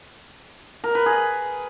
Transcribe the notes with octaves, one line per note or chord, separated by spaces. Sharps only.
A#4
B4
G#4